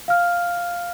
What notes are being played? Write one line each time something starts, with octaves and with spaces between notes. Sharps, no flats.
F5 F6